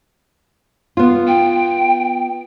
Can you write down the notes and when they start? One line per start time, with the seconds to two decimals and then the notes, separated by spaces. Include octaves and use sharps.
0.97 B3 F4
1.27 G5